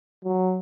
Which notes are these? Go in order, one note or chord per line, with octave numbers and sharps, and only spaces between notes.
F#3